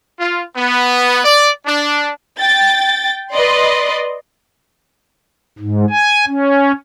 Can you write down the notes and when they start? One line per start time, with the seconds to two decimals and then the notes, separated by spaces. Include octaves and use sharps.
0.20 F4
0.56 B3
1.24 D5
1.66 D4
2.39 G5 A6
3.31 B4 D5 D#5 C6
5.59 G#2
5.90 G#5
6.26 C#4